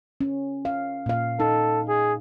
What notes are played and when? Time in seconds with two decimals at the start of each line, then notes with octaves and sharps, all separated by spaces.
0.21 C#4
0.65 F5
1.06 A#2 F5
1.40 D#4 A4
1.88 G#4